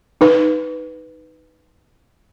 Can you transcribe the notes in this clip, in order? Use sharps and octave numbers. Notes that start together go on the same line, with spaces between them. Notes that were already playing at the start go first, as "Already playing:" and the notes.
D#4 B4